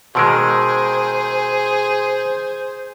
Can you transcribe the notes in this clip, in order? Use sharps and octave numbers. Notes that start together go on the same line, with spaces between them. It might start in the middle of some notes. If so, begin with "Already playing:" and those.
B2 D#3 G#3 G#4 C5 C6 E6 D7